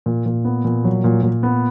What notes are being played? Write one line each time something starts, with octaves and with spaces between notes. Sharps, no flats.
A#2
A#2
B3
A#2
F#3
A#2
A#2
B3